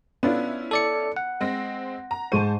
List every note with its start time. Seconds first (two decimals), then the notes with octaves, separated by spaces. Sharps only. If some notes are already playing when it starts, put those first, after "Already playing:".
0.23 B3 C#4 D4 E4 F4
0.71 A4 D5 C#7
1.17 F#5
1.40 G#3 C4 A#6
2.11 A#5
2.32 G#2 C5 A5 C#6 D#7